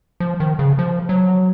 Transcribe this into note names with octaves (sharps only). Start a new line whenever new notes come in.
F3
D#3
C#3
F3
F#3